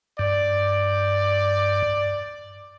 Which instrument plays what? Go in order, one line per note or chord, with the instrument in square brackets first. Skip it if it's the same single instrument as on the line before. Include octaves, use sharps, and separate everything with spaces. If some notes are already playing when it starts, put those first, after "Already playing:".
[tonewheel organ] G2 [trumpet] D5